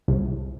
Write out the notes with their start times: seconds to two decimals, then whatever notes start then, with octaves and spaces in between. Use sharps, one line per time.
0.08 C2